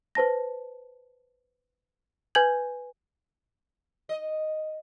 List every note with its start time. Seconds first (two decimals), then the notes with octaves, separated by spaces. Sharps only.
0.15 B4 C5 A5 A#6
2.35 B4 G#5 G6 G#6 F#7
4.09 D#5